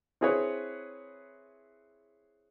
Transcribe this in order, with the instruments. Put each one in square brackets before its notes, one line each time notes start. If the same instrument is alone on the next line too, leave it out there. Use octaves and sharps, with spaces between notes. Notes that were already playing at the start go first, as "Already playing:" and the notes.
[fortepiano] C4 E4 G#4 B4 C#5